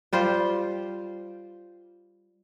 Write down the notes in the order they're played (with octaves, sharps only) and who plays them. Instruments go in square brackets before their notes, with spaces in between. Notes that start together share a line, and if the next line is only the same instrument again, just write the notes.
[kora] G3 F4 C5